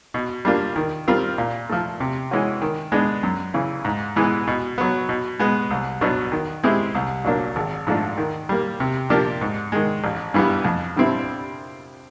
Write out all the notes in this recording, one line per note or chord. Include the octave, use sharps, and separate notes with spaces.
B2
G3 A#3 D4 F4
D#3
G3 C4 F4 A#4
A#2
F3 A3
C3
E3 G#3 C#4 F#4
D#3
G#3 B3 D4
F#2
C#3 E3
G#2
E3 G#3 B3
B2
F#3 B3
B2
G#3 B3
C2
B2 F#3 B3 D4
D#3
G#3 C4 E4 G4
C2
A#2 F#3 A#3 D4
G#1
G#2 F3 A3 D4
D#3
G3 A#3
C3
F3 A#3 D4 G4
G#2
D#3 G#3
A1
G2 E3 G3 B3
F2
D3 G3 C4 E4